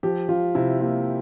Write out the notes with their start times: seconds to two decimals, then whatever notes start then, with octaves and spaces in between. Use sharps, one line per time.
0.03 F3 G4
0.29 F3 F4
0.55 C3 E4
0.81 A#3 F4